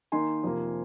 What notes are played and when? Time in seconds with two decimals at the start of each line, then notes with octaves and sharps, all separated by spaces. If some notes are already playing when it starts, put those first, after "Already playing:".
0.12 D#3 A#3 D#4 G#5 C6
0.43 F2 C3 F3 A#3